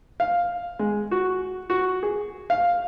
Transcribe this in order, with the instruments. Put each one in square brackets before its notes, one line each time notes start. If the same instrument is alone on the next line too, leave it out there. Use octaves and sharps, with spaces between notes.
[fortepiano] F5
G#3
F#4
F#4
G#4
F5